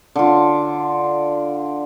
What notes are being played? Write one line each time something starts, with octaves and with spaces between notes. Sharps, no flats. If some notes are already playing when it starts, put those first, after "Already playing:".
D3 F4